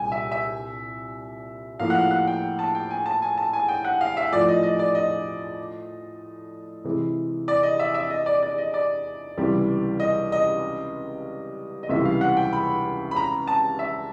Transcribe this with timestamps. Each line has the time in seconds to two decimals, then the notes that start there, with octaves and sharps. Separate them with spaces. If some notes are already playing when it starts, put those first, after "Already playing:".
Already playing: C2 A#2 G3 G5 G#5
0.12 E5
0.32 E5
1.80 A2 F3 A#3 F5
1.90 F#5
1.95 F5
2.11 F#5
2.27 G5
2.59 A5
2.75 G5
2.91 G#5
3.06 A5
3.22 G#5
3.38 A5
3.53 G#5
3.69 G5
3.85 F#5
4.01 F5
4.17 E5
4.32 A2 F3 A3 D5
4.48 D#5
4.63 D#5
4.79 D5
4.95 D#5
6.84 C3 E3 G#3
7.48 D5
7.63 D#5
7.79 E5
7.94 E5
8.10 D#5
8.26 D5
8.43 D5
8.58 D#5
8.74 D5
9.37 C#2 C3 E3 G3
10.00 D#5
10.32 D#5
11.83 D#5
11.89 C#2 C3 E3 G3 E5
12.05 F5
12.21 F#5
12.37 G5
12.53 B5
13.11 B5
13.16 A#5
13.47 A5
13.79 E5